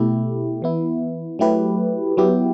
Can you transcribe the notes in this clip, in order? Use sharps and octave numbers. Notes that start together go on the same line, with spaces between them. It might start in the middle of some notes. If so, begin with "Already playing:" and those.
Already playing: B2 A3 E4 G4
E3 B3 E4
F#3 A3 E4 G4 B4
F#3 B3 E4 G4